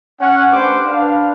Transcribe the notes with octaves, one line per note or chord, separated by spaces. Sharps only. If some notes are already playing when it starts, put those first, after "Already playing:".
C#4 F#5
A3 D4 G4 B4 C5 D6
D4 B4 F5